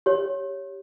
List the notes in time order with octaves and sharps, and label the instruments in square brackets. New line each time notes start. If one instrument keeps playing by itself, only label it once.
[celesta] G4 C#5